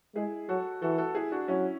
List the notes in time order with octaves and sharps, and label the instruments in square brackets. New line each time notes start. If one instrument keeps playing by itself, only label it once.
[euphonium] G#3 [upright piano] E4 G#4
[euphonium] F#3 [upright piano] F#4 A4
[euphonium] E3 [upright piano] F#4 A4
[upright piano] F#4 A4
E4 G#4
D4 F#4
[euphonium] F#3 [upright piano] C#4 E4